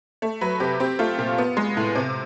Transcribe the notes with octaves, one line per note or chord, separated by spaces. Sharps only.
A3
F#3 B4
C3 G4
C4 G4
A3 F4
A#2
B3
G#3
A2
C3